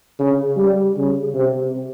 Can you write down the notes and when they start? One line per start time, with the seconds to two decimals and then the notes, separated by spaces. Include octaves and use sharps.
0.19 C#3
0.57 G3
0.97 C#3
1.35 C3